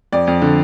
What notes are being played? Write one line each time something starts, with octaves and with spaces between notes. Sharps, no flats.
F2 D5
F2
D3